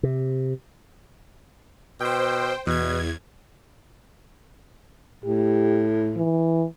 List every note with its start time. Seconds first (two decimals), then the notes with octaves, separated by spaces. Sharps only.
0.03 C3
2.00 B2 C5 G5
2.67 E2 B2 G#6
5.25 A2 G4
6.16 E3